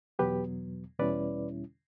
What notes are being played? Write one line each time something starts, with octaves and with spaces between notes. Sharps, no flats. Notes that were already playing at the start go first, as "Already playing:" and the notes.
E2 B2 F#3 B3 G4 B4
E2 B2 G3 C#4 E4 B4 D5